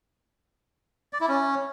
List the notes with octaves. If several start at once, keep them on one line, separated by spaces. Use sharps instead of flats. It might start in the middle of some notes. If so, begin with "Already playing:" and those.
D5
E4
C#4